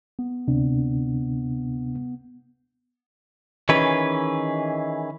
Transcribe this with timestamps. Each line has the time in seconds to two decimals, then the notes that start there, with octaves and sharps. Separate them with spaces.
0.19 B3
0.47 D2 C3 D4
3.69 D#3 E3 C#4 G#4 B4